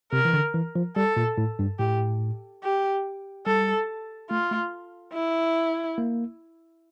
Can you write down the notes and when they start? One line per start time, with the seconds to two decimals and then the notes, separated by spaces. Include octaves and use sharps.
0.12 C3 A#4
0.25 E3
0.33 D3
0.54 E3
0.76 F3
0.96 G3 A4
1.17 A#2
1.38 A2
1.59 G2
1.79 A2 G4
2.63 G4
3.47 G3 A4
4.30 A3 F4
4.51 A3
5.13 E4
5.98 A#3